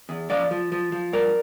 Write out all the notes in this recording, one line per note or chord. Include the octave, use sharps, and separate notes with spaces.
E2
F3 D5 F5
F3
F3
F3
G2 A#4 D5